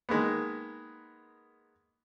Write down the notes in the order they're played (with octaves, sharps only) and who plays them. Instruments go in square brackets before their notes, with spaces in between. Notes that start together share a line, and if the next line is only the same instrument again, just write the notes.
[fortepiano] D#3 G#3 A#3 B3